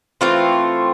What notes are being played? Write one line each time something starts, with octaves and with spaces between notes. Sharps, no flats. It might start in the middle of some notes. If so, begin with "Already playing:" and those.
E3 A3 C4 F4